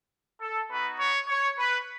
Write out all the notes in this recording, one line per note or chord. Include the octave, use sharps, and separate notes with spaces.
A4
B3 D#4 F#4 B4
C#5
C#5
B4